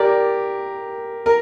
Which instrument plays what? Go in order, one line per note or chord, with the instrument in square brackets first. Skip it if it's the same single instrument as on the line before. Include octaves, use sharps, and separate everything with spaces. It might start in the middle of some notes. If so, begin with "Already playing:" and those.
Already playing: [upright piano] G4 A#4 [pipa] D5
[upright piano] A#4